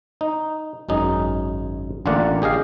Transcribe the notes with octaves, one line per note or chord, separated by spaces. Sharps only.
D#4
G#1 F#2 D#4 G#4
A1 D3 A#3 F4 D5 F#5
G4 G#4 D#5 F5